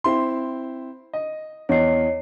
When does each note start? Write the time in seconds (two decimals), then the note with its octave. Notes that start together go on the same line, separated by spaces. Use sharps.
0.04 C4 E4 C6
1.13 D#5
1.69 E2 C#5 D#5 C7